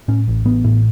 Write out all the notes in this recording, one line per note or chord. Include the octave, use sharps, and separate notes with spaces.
A2 C#4
A1
A1 B3
A2